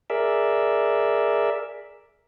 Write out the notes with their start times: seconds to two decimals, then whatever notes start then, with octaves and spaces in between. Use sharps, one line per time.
0.10 G#4 A#4 D5 E5